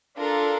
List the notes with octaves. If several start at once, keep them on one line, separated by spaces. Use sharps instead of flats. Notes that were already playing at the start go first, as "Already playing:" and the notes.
D4 F4 A4 A#4